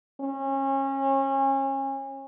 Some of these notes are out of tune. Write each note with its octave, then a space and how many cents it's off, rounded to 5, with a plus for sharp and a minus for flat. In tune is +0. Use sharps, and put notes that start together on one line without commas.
C#4 -30